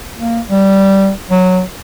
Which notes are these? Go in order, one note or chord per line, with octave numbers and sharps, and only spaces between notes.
A#3
G3
F#3